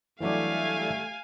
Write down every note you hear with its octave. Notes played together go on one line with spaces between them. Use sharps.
E3 F#3 G3 A3 D4 F5 G#5